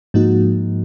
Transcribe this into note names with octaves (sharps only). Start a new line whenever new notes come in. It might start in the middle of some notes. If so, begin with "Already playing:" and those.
G#2 F3 A#3 D#4 F#4